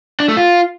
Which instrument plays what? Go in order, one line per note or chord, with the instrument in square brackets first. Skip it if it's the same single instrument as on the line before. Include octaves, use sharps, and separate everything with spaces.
[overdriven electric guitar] D4
A3
F4